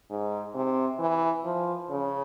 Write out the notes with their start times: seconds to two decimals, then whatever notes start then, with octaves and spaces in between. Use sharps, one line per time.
0.10 G#2
0.55 C3
1.00 E3
1.45 F3
1.90 C#3